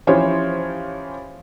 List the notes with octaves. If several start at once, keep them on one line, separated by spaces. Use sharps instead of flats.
E3 F3 C#4 G4 C5 C#5